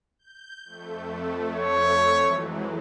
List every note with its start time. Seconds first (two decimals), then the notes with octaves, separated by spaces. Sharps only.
0.19 G6
0.65 F2 A3
1.54 C#5
2.22 E3 F#3 G#3